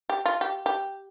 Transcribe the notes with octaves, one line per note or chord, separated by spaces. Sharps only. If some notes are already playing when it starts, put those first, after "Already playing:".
G4
F4
G4
G4